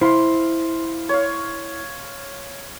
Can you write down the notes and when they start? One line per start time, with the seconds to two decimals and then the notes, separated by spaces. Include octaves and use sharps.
0.01 E4 C5 F5 C6
1.09 C#5 F5